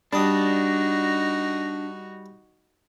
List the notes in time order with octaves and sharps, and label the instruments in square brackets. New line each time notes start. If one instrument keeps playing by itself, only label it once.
[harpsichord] G3 D#6 [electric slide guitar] D4 [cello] D#4 F#4